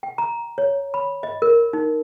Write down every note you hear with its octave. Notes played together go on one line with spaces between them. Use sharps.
G5
A#5
C#5
B5
D#5
A#4
D#4